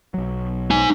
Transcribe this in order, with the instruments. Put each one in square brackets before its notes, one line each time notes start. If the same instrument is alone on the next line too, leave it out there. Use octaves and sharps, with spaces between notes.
[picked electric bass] B1 F#3
[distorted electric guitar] D#4 G#5